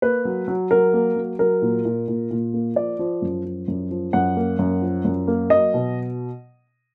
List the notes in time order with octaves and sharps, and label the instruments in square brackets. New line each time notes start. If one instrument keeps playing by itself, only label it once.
[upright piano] A#3 B4
F#3
F#3
F#3 A#4
A#3
F#3
F#3 A#4
A#2
A#2
A#2
A#2
A#3
F3 D5
F3
F#2
F3
F#2
F3
F#2 F#5
A#3
F#2
F3
F#2
A#3
F#3 D#5
B2